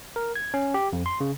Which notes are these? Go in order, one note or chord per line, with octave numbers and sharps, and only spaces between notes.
A#4
G#6
C#4
G4
F2
C6
C#3